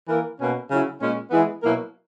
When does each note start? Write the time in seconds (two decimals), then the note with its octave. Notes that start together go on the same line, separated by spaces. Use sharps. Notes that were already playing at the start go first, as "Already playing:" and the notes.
0.08 E3 A#3 E4 A#4
0.38 B2 A#3 C#4
0.70 C#3 F#3 C#4 E4
1.01 A#2 G#3 C#4
1.31 E3 G#3 B3 E4 G#4
1.62 B2 F#3 A#3 E4 A#4